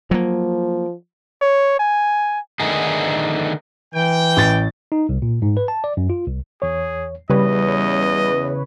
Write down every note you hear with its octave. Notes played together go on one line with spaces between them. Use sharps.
F3 F#3 A#3
C#5
G#5
D3 D#3 A3 B3 D#4 G#4
E3 G5
A1 A6
D#4
C2
A#2
G#2
B4
A5
D5
F#2
F4
C2
E2 G#4 C#5
E2 C#3 G3 B4 C#5 D#5